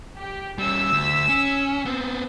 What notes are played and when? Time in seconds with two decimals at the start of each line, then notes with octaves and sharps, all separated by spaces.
0.15 G4
0.58 G3 C#4 E6 B6
0.92 D2
1.29 C#4
1.85 B3 C4